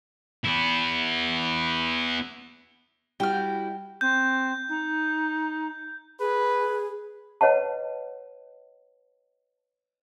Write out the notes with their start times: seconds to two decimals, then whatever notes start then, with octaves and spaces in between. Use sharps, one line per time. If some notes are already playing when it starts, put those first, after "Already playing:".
0.44 B3 E4
3.20 G3 E4 F#4 G5 F6
4.01 C4 G6
4.69 D#4
6.20 G#4 B4
7.41 B4 C#5 D#5 F#5 A5